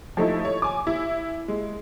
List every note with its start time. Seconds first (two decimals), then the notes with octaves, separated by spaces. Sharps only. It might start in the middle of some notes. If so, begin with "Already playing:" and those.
0.17 F3 A3 D#4 E4
0.45 C#5
0.62 G#5 D6
0.87 E4
1.48 G#3